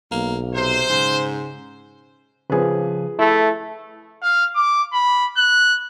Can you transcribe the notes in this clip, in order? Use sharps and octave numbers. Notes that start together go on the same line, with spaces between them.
B1 A#3
C3 C5
G#2 C#3
C#3 F3 G#4 B4
A3 E4
F5
D6
B5
F#6